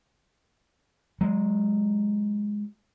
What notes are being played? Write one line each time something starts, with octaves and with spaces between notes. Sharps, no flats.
F#3 G#3